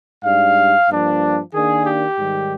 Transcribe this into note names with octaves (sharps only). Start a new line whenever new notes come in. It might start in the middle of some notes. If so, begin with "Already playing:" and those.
G#2 G3 D4 F5
G2 F3 A#3 D4
D#3 A#3 D4 G#4
G4
G#2 D#3 G3